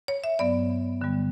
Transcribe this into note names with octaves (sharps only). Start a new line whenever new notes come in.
C#5
E5
G2 F#3 B3 D5
G2 D3 G3 B3